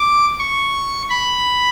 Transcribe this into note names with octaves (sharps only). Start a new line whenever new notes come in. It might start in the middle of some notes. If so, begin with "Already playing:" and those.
Already playing: D6
C#6
B5